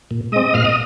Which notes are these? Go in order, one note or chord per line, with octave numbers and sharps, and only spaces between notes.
A#2
G#3 C4 D#5 D#6
A#2 F5 F6
D#5 D#6